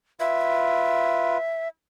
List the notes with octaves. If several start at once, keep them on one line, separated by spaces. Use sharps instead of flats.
F4 B4 E5